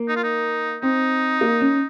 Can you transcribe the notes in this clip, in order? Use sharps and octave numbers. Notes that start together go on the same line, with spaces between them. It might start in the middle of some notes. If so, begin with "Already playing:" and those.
Already playing: A#3
D#4
F4
D#4
C4 D#4
A#3
C#4